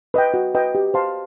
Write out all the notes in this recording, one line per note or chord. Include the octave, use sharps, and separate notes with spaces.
B4 D#5 G5
F#4
B4 D#5 G5
G4
C5 F5 A5 C6